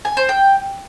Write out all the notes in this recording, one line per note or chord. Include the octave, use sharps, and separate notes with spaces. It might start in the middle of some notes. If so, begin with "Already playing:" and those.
G#5
C5
G5